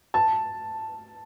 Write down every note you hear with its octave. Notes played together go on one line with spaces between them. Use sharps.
A5